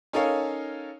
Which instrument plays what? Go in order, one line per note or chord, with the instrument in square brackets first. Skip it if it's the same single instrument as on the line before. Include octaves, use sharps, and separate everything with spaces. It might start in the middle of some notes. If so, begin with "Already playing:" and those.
[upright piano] C#4 D#4 A4 A#4 C#5 F5